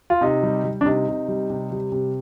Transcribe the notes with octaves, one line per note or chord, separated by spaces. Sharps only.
F4
C3 D#4
G3
G3
D4
C3 D#4
C3
G3
C3
G3
C3